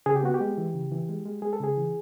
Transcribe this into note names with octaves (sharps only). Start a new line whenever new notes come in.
C#3 G#4
G4
B3 F#4
G4
G#3
E3
C#3
E3
G#3
G#3
G#3 G#4
A4
C#3 G#4
E3